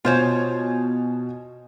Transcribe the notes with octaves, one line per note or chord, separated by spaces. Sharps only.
B2 F4 C5 C#5 G#5